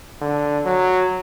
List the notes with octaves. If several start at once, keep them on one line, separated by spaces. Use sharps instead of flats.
D3
F#3